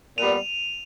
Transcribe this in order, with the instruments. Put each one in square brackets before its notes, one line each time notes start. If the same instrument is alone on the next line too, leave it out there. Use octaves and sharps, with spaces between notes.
[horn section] A#2 G3 B3 [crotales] D#7 F7